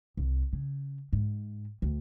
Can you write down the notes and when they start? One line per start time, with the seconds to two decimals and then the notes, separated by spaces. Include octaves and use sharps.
0.17 C2
0.53 C#3
1.13 G#2
1.82 D2